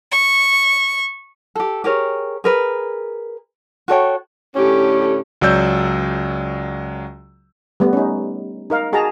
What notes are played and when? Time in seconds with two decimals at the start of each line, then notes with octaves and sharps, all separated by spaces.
0.12 C#6
1.55 G4 A4
1.84 G4 G#4 A#4 C#5
2.44 G#4 A#4 B4
3.88 F#4 A4 C#5 G5
4.55 A2 D3 C#4 G4
5.41 C#2 F#3 D5 E6 G6
7.80 G3 A3 B3
7.93 C#4 D#4
8.70 D#4 A#4 F5
8.92 F#4 G#4 D#5 A5 A#5